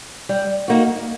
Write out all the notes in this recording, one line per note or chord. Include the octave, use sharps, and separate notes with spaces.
G3
A#3 D#4 F#4